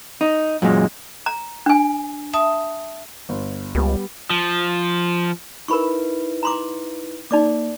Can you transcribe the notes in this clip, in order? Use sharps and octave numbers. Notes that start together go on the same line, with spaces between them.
D#4
F#2 A#2 G#3
A#5
D4 G#5
E5 A5 D#6
G1
C#2 G3 B3
F3
D#4 E4 A#4 B4 B5 C#6
A#5 C6 D6
A#3 D#4 D5 D6